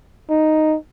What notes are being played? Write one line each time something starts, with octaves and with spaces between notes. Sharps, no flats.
D#4